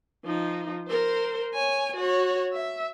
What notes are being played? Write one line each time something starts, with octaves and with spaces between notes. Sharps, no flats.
F3 D#4
A#4 C5
C#5 G#5
F#4 C#5
E5